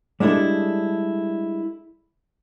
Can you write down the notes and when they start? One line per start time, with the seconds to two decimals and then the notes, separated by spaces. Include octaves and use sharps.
0.20 G3 G#3 D4 E4 A4